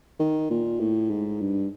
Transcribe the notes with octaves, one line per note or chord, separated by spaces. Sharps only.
D#3
A#2
A2
G#2
G2